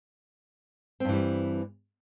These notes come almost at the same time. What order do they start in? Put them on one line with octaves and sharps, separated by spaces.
C4 G2 E3 G3